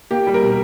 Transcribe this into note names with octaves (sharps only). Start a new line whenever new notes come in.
A#3 G4
G3
A#4
B2